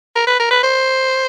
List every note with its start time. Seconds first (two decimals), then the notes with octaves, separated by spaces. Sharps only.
0.16 A#4
0.27 B4
0.40 A#4
0.51 B4
0.63 C5